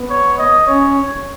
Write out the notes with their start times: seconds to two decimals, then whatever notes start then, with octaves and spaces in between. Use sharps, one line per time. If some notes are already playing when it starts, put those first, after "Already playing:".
Already playing: B3
0.10 C#5
0.38 D#5
0.67 C#4 C#5